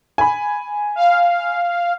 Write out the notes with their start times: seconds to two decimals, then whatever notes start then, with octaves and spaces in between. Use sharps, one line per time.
0.18 G#5 B5
0.96 F5